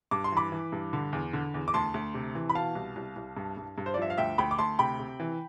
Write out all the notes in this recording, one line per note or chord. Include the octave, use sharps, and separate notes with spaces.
G2 D6
C6
E3 B5 D6
E3
G2
D3
E2
D3
E2
D6
D2 A5 C6
D2
C3
E3
B5
B2 F5 A5
C2
C2
C2
G2
G2
G2
C5
D5
F3 E5
F5
D2 E5 G5
D2 G5 B5
D6
D2 A5 C6
C3 G5 B5
C3
E3